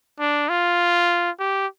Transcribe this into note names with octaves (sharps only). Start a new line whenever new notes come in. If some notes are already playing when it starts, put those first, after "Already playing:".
D4
F4
G4